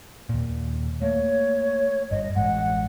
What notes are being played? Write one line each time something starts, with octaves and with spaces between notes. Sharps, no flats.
D#2 A#2
A3 A#3 C#5
G1 G2 D#5
A1 G2 G#3 F#5